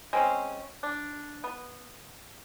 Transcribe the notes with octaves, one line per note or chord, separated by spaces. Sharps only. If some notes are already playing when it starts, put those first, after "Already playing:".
G#3 C4 C#4
D4
B3